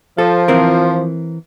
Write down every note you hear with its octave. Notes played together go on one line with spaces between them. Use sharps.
F3 A4
E3 C4 A#4